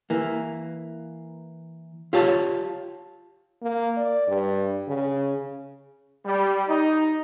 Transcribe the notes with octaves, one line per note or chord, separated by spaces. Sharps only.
E3 A#3
F4 G4 C#5 A5
A#3
D5
G2
C#3
G3
D#4